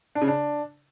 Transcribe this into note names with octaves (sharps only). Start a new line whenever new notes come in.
D4
C#3
D4